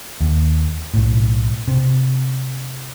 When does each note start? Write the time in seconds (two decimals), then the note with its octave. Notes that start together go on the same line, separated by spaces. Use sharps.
0.21 D#2
0.94 B1 A2
1.68 C3